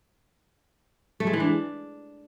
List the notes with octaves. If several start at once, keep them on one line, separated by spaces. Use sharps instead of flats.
A3
G#3
E3
D4